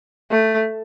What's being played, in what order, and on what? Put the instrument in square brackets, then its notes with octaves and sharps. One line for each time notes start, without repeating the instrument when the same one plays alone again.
[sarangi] A3